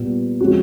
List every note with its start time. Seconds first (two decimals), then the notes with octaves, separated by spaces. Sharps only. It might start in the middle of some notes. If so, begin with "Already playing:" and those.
Already playing: A#2 G3 B3
0.41 F3 G#3 C#4 F#4